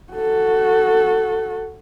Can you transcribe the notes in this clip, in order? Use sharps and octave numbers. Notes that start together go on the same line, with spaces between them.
F#4 A4